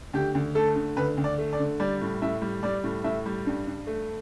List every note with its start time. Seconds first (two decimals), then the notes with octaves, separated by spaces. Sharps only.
0.13 D2 G4
0.35 D2
0.55 A3 A4
0.76 D3
0.97 D2 B4
1.18 D2
1.24 D5
1.38 A3
1.53 D5
1.59 D3
1.80 G3 D5
2.01 A2
2.22 A2 E5
2.42 G3
2.63 G3 D5
2.84 A2
3.04 A2 E5
3.26 G3
3.47 G2
3.67 G2
3.87 A3